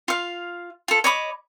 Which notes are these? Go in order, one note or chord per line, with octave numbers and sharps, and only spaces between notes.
F4 F5
F4 A4
C#5 D#5 B5 D6